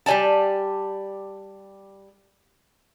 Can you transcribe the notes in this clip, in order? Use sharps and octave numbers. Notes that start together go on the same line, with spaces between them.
G3 G4 D5 G#5 A5